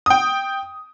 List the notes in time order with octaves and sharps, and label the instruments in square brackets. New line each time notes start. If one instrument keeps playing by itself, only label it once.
[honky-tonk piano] G5 D#6